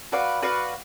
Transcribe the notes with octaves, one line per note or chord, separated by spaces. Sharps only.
F#4 B4 D5 F5
F#4 B4 D5 F5